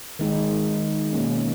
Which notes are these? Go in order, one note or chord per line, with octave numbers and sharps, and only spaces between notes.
D#3 G#3 D#4
B2 A#3 C#4